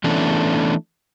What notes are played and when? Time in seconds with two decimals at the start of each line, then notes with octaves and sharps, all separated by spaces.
0.04 E3 A3 B3 C#4 D4